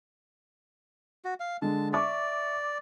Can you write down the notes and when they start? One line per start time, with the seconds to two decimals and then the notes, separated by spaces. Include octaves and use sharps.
1.25 F#4
1.40 F5
1.62 D3 G#3 A5
1.93 D5 E5 C#6 D6